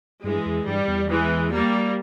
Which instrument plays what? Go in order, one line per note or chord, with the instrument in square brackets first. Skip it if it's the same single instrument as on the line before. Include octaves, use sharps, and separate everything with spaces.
[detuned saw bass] G2 [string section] E3 G#3
[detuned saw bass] E2
[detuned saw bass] G2 [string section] G3
[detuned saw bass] E2
[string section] E3 G#3
G3 A#3